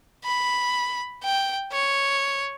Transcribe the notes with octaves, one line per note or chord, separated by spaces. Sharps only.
B5
G5
C#5